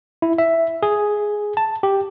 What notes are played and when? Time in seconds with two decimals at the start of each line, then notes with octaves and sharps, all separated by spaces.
0.22 E4
0.38 E5
0.83 G#4
1.57 A5
1.83 G4